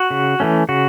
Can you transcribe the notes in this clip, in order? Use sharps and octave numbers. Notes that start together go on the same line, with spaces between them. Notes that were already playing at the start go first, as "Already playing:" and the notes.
Already playing: F#4
C#3
E3 A3 C#4
C#3 F#4